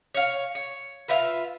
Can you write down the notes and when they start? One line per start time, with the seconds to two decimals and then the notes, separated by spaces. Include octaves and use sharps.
0.15 C#5 F5
0.55 C#5
1.08 F4 B4 E5 F5